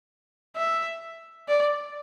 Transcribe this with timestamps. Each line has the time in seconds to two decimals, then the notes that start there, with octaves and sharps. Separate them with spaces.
0.56 E5
1.48 D5